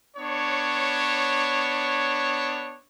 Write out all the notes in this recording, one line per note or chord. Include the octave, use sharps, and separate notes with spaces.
B3 D4 C#5